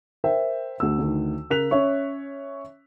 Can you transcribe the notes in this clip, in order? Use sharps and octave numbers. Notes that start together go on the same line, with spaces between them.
A#4 C5 E5 G5
D2 E6
D2 D#3
C#3 A#4 F#6 B6 F7
C#4 C#5 E5 C#6